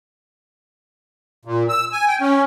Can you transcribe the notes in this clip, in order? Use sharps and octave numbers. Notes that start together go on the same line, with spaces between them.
A#2
E6
G#5
G5
C#4